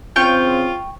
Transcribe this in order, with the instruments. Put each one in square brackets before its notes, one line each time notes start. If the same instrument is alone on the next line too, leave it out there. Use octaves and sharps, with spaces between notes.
[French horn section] C#3 C4 [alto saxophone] F4 [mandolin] G5 C#6